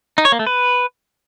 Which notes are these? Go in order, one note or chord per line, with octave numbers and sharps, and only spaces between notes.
D#4
C#5
A#3
A3
B4